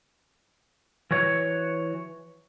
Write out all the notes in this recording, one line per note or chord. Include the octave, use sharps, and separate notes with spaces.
E3 F#4 C#5